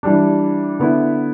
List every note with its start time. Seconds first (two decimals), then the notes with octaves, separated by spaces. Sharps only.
0.03 E3 G3 D4
0.79 D3 B3 E4